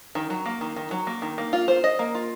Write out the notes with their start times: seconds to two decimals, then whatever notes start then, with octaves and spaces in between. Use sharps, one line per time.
0.15 D#3
0.30 F#3
0.46 A#3
0.61 D#3
0.76 D#3
0.91 F#3
1.07 A#3
1.22 D#3
1.38 A#3
1.53 F4
1.68 C5
1.84 D#5
1.99 A#3
2.15 F4